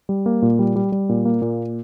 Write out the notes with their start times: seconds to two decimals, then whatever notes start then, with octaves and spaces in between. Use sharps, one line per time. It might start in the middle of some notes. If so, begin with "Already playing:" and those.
0.09 G3
0.26 A#3
0.42 A#2
0.59 G3
0.76 G3
0.92 G3
1.09 A#2
1.25 A#3
1.42 A#2